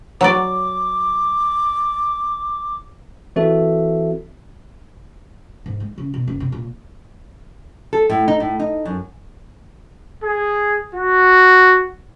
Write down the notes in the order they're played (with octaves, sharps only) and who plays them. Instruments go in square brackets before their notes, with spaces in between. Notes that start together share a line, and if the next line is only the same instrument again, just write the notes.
[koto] F#3 D5 [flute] D6
[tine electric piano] E3 C4 F#4 A4 E5
[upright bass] G#2
G#3
C#3
B2
F#1
C3
A#2
[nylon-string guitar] A4
A2
D#4
A2
D#4
F#2
[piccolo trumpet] G#4
F#4